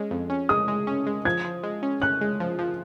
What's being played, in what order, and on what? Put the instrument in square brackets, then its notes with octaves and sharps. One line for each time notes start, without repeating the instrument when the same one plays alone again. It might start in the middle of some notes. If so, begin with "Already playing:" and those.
Already playing: [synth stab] G#3 C#4
F2
C#4
[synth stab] G#3 [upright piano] D#6
[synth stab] G#3
C#4
G#3
[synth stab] F3 [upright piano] G#6
[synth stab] F3
G#3
C#4
[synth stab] C#4 [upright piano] F#6
[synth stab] G#3
F3
F3